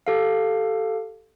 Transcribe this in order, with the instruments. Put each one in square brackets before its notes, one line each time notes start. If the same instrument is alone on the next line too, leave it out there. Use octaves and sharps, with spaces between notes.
[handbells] G4 A4 F5